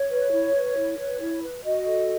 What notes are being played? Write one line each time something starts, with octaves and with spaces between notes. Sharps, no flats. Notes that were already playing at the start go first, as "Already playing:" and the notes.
Already playing: C#5
B4
E4
B4
E4
B4
E4
B4
F#4 D#5
A4